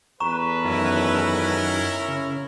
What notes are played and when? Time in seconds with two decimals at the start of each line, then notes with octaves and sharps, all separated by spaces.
0.20 E2 A4 B4 A#5 C#6 E7
0.64 F#2 D#3 C#4 E4 A#4
2.08 C#3